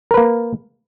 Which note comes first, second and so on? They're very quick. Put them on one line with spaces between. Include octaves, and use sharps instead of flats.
A#4 B4 A#3